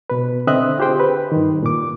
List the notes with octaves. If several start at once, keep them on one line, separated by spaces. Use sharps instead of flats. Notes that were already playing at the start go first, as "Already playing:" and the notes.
B2 B4
D3 C4 D#5 E5 D#6 F#6
F4 G4 G#4 C5 G5
B4
G2 D#3
A#2 D6